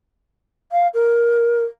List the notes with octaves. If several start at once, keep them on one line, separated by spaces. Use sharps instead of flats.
F5
A#4